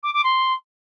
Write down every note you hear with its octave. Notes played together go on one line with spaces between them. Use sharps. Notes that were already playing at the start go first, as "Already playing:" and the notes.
D6
D6
C6